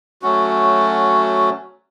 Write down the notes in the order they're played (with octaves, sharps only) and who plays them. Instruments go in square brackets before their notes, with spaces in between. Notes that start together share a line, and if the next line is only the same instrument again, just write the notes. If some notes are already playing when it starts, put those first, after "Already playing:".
[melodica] F#3 A3 C#4 F#4